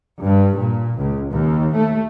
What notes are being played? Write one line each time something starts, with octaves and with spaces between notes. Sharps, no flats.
G2
A#2
C#2
D#2
A3